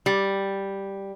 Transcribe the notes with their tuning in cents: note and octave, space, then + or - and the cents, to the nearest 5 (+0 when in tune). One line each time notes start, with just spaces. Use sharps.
G3 +0